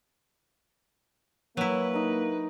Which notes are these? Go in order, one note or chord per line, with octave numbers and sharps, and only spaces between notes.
F#3 A#3 E4 B4
D#4 A#4